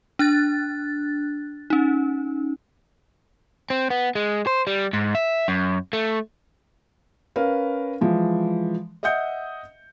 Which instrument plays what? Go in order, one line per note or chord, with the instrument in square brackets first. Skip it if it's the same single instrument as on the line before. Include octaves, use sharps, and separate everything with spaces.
[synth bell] D4 F#6 A6
C#4 D#4
[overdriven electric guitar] C4
B3
G#3
C5
G3
G#2
E5
F#2
A3
[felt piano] C#4 A#4 B4 F5
E3 F3 G#3
D#5 E5 F#5 D#6 G6 C#7